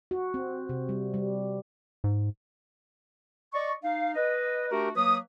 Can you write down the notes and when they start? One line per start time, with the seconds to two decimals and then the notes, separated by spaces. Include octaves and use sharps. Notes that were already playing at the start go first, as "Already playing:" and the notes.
0.11 F#4
0.34 C4
0.69 C3
0.89 G3
1.14 G3
2.04 G#2
3.53 D5 D#5 C#6
3.83 D#4 F5
4.15 B4 D#5
4.71 A3 D4 F#4 G4 A#4
4.95 F#3 A#3 B4 D#6